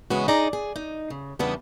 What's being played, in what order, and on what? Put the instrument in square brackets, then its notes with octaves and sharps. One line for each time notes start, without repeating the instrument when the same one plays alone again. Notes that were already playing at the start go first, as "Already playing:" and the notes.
[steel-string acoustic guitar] C#3 E3 G#3 B3 C#4 F#4
D#4 G#4 D5 A#5
G#4
D#4
C#3
E2 C#3 G3 B3 D4 D#5